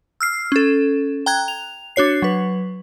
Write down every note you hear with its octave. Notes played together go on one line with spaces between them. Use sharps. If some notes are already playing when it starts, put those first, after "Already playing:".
E6 F6 C7
C#4 A4
G5 A#5 F#6 G#6
F7
D4 F#4 C#5 C7
F#3 B4